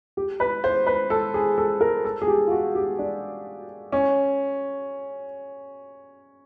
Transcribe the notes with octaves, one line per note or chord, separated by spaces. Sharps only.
G4
B4
C5
B4
A4
G#4
A4
A#4
A4
G#4
G4
F4
F#4
G4
D4
C#4